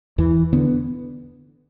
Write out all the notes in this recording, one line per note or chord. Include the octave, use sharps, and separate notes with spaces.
E2 E3
D3 B3